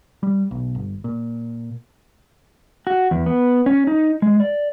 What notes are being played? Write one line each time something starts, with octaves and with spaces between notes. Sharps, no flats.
G3
B1
G1
A#2
F#4
E2
B3
C#4
D#4
G#3
D5